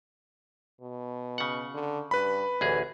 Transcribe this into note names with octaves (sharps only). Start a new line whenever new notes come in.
B2
C#3 F#5
D3
G2 B4 B5
A1 D2 E3 G#4